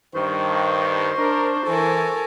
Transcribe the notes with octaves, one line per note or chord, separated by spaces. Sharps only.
G2 D#3 C5 C#6
D4 A#4
E3 A4 A#4 G#5